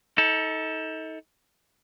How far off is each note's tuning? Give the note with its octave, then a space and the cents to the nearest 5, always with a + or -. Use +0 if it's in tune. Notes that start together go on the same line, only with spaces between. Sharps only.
D#4 +35 A4 +0